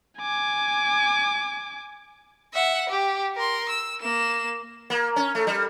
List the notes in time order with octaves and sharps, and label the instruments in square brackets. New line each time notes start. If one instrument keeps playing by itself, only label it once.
[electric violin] G#5 D6
[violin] E5 F#5
G4
A#4 C6
E6
A#3 E7
[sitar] A#3
C#4
A3
G3